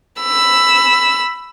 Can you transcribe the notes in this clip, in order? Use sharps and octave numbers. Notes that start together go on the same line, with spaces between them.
B5 E6